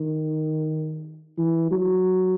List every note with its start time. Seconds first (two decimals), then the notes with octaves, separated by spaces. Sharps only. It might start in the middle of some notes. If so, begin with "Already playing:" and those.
Already playing: D#3
1.38 E3
1.71 F#3